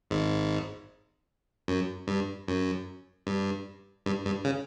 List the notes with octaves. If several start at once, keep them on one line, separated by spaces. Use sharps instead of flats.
G#1 G#2
F#2
G2
F#2
G2
G2
G2
C#3